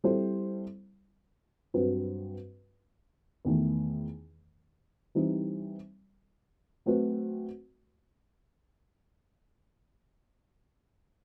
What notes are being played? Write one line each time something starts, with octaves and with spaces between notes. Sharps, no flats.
G3 C4 E4 A4 C5
G2 F#3 C4 F#4 B4
E2 D#3 A3
E3 G3 C4 D#4
F#3 A3 C4 F#4 B4